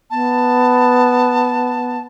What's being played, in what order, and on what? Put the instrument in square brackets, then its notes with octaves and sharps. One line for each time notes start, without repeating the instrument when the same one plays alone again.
[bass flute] B3 [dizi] A5